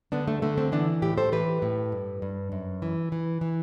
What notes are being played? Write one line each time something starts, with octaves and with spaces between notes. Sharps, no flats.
D3 B3 D4
A3
D3 A3
A3 C4
E3 B3 D4
A2 E4 G4
A4 C5
E3 G4 B4
A2
G2
G2
F#2
E3
E3
E3